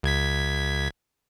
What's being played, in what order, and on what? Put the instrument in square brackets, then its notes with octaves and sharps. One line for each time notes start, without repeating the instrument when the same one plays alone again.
[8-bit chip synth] C#2 G#6 B6